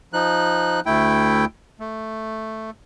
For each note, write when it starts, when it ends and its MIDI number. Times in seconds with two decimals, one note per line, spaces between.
0.13 0.80 53
0.13 0.80 63
0.13 0.80 90
0.86 1.45 38
0.86 1.45 57
0.86 1.45 64
0.86 1.45 79
1.80 2.70 57